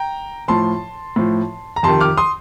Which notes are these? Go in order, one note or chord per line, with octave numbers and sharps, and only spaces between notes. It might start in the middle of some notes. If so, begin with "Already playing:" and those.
Already playing: G5 A#5
A2 F3 A5 C6
A2 F3
A#5
F2 C3 D#3 A5 C6
D6 F6
C6 D#6